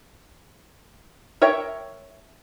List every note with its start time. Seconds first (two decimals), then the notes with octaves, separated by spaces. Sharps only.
1.42 A#4 C#5 E5 G5